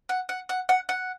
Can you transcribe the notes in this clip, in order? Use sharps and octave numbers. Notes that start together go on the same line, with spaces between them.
F#5
F#5
F#5
F#5
F#5